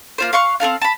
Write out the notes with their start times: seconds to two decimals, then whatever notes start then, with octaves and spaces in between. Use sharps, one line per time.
0.18 A#3 F4 C5
0.33 F5 C6 C#6 F#6
0.60 C4 F4 A4 F5
0.82 A5 B5